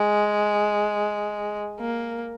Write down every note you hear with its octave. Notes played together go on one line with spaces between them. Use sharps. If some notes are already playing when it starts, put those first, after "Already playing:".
Already playing: G#3
A#3